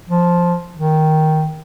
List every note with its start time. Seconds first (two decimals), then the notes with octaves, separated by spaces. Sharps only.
0.09 F3
0.76 D#3